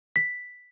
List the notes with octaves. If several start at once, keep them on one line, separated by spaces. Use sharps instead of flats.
B6